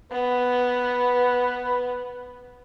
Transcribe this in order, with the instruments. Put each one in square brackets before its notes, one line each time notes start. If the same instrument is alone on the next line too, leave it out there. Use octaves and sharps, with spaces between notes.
[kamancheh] B3 [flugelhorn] B4